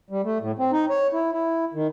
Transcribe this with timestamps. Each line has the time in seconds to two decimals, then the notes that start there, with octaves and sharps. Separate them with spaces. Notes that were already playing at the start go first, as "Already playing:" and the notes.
0.10 G3
0.24 A3
0.41 A2
0.58 C4
0.72 D#4
0.89 C#5
1.13 E4
1.32 E4
1.74 D#3